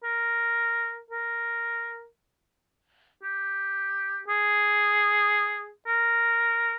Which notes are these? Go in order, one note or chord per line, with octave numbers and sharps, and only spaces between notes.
A#4
A#4
G4
G#4
A#4